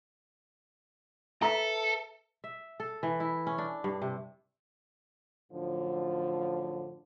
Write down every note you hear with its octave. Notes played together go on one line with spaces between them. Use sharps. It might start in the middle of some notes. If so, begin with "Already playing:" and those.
A4 B4 E5 A#5
E5
A4
E3
E4
C#4
D4
G2
C3
F#2 A2 D3 F3